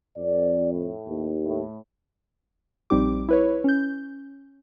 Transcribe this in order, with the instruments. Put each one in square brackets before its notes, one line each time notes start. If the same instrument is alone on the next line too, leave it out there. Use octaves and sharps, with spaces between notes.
[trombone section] F2 [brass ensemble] D5
[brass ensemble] A2
[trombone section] D#2
[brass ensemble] A2
[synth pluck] A#1 G3 C4 D#4 G4 D6
E4 B4 C#5
C#4 G6